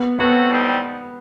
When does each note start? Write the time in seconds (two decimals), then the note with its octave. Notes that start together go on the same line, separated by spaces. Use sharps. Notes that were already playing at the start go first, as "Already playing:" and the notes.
Already playing: B3
0.18 F#3 A3 B3 C4 F#4 A4
0.49 A2 G3 C4 D#4